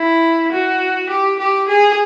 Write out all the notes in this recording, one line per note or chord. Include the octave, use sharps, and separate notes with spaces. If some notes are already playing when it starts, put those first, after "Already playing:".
Already playing: E4
F#4
G4
G4
G#4